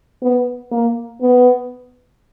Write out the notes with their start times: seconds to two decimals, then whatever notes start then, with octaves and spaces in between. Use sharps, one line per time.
0.22 B3
0.72 A#3
1.21 B3